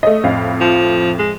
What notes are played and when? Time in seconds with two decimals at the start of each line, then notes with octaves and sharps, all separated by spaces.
0.03 A3 D#5
0.23 F2 A2 F5
0.61 F3
1.19 G#3